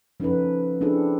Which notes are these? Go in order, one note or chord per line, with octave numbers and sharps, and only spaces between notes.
F3 C#4 D#4 A4 B4
C4 D4 E4 G#4 A4